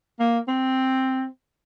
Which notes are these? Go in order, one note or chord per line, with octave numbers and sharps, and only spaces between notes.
A#3
C4